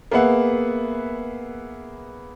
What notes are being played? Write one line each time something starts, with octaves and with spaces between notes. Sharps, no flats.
A#3 B3 G#4 B4 E5 F#5